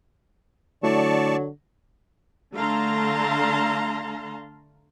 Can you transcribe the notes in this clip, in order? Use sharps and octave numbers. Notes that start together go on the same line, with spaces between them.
D3 F#3 A3 E4 D5 A5 C#6
D3 A3 F5 A5 A#5 C6